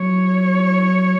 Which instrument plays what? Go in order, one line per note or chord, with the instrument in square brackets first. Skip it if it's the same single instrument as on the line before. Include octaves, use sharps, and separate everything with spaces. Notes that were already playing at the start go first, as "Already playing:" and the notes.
Already playing: [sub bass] F#3 [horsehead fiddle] C#5